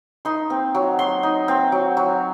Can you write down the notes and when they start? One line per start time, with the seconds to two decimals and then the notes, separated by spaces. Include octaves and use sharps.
0.25 D#4 C6
0.50 C4
0.75 F#3
0.99 F#3 C6
1.23 D#4
1.48 C4
1.72 F#3
1.97 F#3